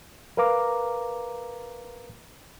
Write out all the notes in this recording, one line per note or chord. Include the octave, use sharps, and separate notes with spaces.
A#4 B4 F5 A#5 D6